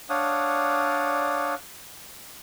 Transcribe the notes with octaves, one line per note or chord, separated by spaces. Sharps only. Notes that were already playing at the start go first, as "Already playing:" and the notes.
D4 C#5 D5 F5 F#5 D#6